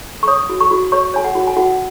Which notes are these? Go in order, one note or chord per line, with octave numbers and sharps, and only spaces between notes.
C#6
C#5 D#6
F#4
C#6
F#4
C#5 C#6
C#5 G#5
F#5
F#4
G#5
F#4 F#5